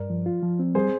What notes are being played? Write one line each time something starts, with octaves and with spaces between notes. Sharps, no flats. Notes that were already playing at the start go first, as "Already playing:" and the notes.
Already playing: G2 A#4 D5
F3
F4
F3
C4
G3 G#4 C5